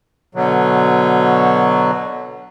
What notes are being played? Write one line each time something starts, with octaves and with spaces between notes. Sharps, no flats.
B2 D3 F#3